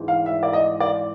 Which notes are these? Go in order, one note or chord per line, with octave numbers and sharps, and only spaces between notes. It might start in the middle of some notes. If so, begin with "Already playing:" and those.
Already playing: G#1 G#2 E3
F5
E5
D5
D#5
D5